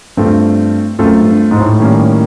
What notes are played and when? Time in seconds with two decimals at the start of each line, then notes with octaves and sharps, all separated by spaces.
0.17 G2 A3 C4 F4 A4
0.99 F#2 A3 C4 F4 A4
1.20 G2
1.51 G#2
1.60 A2
1.80 D#3 G3 A#3 C#4